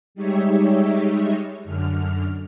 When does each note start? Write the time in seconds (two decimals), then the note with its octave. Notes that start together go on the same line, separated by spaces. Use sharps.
0.15 G3 G#3 D#4 G4 C#5 E5
1.64 F#2 D3 F6